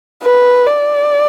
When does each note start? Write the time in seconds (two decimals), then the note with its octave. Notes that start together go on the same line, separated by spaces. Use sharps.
0.23 B4
0.66 D5